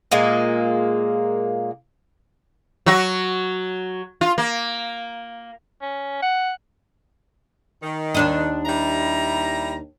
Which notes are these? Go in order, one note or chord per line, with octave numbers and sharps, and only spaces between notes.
A#2 G#3 A#3
F#3 F#4
F4
A#3
C#4
F#5
D#3
D#2 D4 D#5
G3 E4 A#5